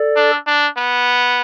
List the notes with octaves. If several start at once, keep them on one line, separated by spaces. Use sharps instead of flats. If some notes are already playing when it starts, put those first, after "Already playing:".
Already playing: A4 D5
D4
D4
B3